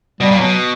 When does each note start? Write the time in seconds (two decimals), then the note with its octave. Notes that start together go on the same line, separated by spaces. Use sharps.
0.20 B2 G3
0.31 A#2
0.36 B2 F#3